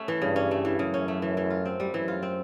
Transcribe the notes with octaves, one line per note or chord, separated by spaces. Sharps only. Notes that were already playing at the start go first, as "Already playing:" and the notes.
Already playing: A3 C#4
E3
G2 C#3
C#4
A3
E3
F#2 C#3
C#4
A3
E3
E3
F4
C4
G3
F#2 E3
F4
C4